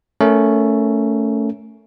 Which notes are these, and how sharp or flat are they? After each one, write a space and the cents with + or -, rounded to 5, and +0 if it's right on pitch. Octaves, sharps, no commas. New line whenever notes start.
A3 +10 C#4 +15 A#4 +0